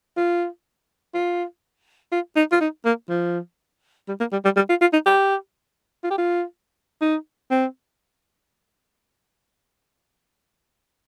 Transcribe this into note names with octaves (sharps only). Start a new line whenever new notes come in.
F4
F4
F4
D#4
F4
D#4
A#3
F3
G3
A#3
G3
G3
G3
F4
F4
D#4
G4
F4
G4
F4
D#4
C4